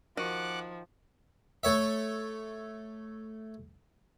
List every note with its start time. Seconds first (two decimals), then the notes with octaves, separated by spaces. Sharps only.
0.17 D#3 F3 F#4 F#5 D6 F#6
1.63 A3 C#5 E5